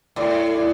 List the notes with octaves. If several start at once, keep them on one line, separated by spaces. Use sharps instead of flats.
A2 D5
D5